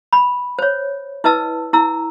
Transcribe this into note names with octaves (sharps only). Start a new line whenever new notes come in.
B5
C5 C#5
E4 B4 D#5 A5 E6
E4 A#5 E6